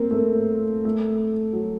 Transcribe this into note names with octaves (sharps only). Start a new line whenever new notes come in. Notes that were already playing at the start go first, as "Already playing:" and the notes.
Already playing: A#3 C4
A3
A#3
A3
F#3